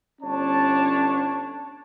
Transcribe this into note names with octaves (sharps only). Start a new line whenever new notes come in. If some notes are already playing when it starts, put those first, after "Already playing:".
G1 C#4 D4 C#5 A5